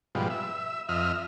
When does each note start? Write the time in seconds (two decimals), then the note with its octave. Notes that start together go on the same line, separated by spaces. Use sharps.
0.15 G#2 B2 F3 G3
0.30 E5
0.89 F2 D#5 E5 F6